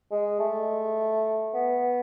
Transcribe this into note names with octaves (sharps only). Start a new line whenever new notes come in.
G#3
A3
B3